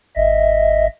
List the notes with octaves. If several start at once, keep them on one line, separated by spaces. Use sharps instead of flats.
G#1 D#5 E5